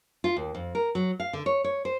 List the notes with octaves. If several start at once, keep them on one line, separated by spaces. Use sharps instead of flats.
F4
D#2
F2
A#4
F#3
F5
D3
C#5
C#5
C5